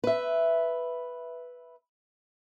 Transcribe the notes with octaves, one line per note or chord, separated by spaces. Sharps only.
B4 E5